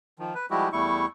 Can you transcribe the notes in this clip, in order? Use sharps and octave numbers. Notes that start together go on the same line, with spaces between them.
D#3 F3
B4
F3 G3 G#3 E4 F#4 G4
E2 G3 A3 E4 C#6